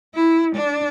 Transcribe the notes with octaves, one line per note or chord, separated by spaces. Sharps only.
E4
D4